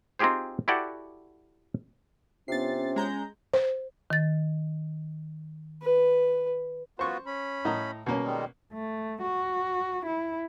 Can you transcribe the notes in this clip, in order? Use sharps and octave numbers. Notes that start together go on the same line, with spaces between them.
C4 D#4 F4 G4 G#4 C5
E4 F#4 G4 A4 D5 F#5
C3 B3 C#4 D4 F4 A6 C7
G#3 A#5 G6
C5
D#3 A6
B4
B3 F4 F#4 C5 C#6
C#4 B5
A2 D#5 A#5
B2 A#3 C#4
D#3 G3 G#3
A3
F#4
E4